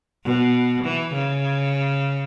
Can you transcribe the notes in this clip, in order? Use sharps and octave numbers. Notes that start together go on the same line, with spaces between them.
B2
E3
C#3